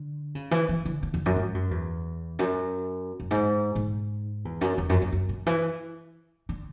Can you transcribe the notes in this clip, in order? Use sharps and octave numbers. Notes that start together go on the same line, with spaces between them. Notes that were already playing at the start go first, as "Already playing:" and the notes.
Already playing: D3
C#3
E3
E3
D3
D3
E2
F#2
G#2
F#2
E2
F#2
F#2
G#2
G#2
E2
F#2
E2
F#2
F#2
F#2
C#3
E3
D3